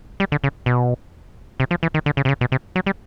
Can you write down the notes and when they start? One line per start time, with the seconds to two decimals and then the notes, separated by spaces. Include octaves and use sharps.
0.20 G3
0.32 D3
0.44 C#3
0.66 B2
1.60 C3
1.71 F3
1.83 E3
1.94 D#3
2.06 D3
2.17 C#3
2.25 C3
2.29 C#3
2.41 B2
2.52 C3
2.76 F#3
2.86 G3